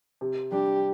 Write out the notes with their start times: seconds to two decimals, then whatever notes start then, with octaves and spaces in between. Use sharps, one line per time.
0.21 C3
0.51 G3 D4 G4